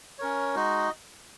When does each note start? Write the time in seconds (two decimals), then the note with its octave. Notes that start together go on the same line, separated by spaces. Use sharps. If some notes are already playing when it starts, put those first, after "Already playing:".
0.19 C#4 A#4 C#5
0.55 G#3 D#4 F#4 D#5